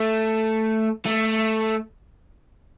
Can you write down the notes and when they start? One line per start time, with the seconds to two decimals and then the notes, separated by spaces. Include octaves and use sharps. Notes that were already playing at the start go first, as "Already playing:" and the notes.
Already playing: A3
1.06 A3